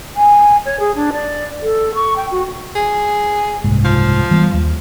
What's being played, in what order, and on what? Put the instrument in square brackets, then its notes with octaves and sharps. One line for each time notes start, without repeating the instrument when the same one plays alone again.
[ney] G#5
C#5
G#4
D4
D5
A4
C#6
G5
F#4
[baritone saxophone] G#4
[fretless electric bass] F#1 C2 G#2
[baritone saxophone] F3
[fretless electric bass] E3 G3 B3
D#2